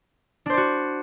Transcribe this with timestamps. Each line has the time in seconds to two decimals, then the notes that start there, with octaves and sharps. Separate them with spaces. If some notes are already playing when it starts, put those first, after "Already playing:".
0.46 D4
0.50 C5
0.53 D5
0.57 F#4